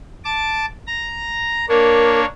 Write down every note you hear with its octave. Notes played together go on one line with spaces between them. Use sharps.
A5 D6
A#5
A#3 D4 A#4 C#5